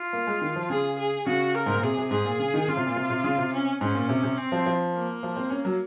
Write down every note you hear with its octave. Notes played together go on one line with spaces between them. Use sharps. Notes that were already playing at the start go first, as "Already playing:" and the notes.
Already playing: F4
A#3
G#3
D#3
F3
C#3 G#4
G#4
C#3 F#4
A#4
G#2
A#2
C3 G#4
C3
G#2 G#4
A#2
C#3
D#3
C#3 F4
C3
A#2
C3
C3
C#3
C3
C#4
G#2 C#4
A#2
C3
C3
C4
F3
F3
A#3
F3
C4
C#4
F#3